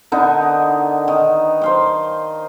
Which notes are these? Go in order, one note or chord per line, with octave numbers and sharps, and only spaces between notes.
D3 B3 D#4 A#4
D#3
C5 F5 G5